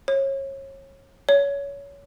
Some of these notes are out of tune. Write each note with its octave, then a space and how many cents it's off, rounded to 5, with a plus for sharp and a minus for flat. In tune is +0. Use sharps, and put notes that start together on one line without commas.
C#5 -30
C#5 +25